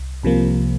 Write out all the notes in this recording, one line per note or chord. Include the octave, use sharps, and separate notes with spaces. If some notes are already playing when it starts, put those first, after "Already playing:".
Already playing: C2
C2 C3 F3 A#3